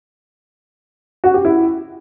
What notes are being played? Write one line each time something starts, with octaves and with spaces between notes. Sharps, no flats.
F#4
G4
E4